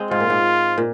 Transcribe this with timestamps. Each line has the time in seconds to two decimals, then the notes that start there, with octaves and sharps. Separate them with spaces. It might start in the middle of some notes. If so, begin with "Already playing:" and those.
Already playing: G#3 C4
0.11 G#2 F4
0.20 A#2
0.30 G#2
0.78 A#2